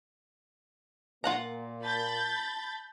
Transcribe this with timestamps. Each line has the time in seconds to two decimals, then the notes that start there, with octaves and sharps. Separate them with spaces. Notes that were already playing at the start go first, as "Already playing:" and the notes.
1.24 A#2 A#3 F4 F#5 A#5
1.83 A5 B5 G6 A6